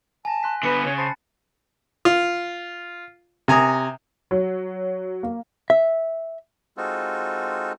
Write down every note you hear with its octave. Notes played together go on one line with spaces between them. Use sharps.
G#5 A5 A#6
C6 F#6 B6
D3 B3 B4 C#7
C#3 C#5
C5 A5 B5 A6
F4
C3 G#5 A#5 D#6
F#3
A#3
E5
G#3 C4 D#4 F4 F#4 A4